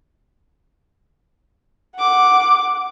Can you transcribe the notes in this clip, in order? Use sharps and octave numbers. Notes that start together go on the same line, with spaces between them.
F#5 D6